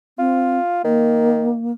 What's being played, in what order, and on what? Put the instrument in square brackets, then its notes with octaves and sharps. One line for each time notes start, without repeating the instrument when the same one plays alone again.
[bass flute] C4 [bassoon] F4
[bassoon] D#3 [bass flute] A#3